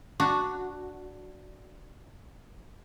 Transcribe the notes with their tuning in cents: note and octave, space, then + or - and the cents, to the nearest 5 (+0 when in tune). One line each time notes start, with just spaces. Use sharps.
D4 +0 F#4 +0